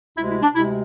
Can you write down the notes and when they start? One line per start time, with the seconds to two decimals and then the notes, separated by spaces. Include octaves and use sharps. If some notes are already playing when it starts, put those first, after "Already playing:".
0.16 D2 C3 G#3 E4
0.29 E4
0.42 D4
0.55 D2 C3 G#3 E4